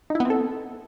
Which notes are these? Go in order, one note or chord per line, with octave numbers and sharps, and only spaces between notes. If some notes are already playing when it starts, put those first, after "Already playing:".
D#4
E4
B3
C4
A4